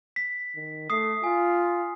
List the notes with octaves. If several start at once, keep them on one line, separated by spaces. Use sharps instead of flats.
B6
D#3
A3 D#6 C7
F4 G#5